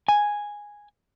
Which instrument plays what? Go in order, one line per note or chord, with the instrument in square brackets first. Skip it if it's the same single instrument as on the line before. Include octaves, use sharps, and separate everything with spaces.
[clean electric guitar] G#5